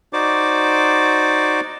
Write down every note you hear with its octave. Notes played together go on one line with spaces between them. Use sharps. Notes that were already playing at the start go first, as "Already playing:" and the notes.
D#4 F#4 C5 D5 D6